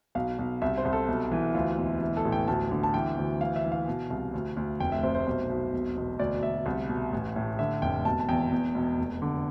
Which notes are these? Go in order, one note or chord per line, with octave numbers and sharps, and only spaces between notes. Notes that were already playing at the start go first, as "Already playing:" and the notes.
B1 F5
B1
C2 E5
C5
C2
A4
B1
E3
D2 F4
E1
E3
A4
A1
G5
D2 A5
D3
A5
E3 G5
D2
E3 F5
E5
E3
F5
B2
C2
D2
D2
F1 G5
E5
C3 C5
C5
B1
B1
E1
E1
D2 D5
D2 E5
C2
B2
A1
A2
D3 E5
F1 G5
E1 A5
A5
E2 G5
E2
E1
F1
D3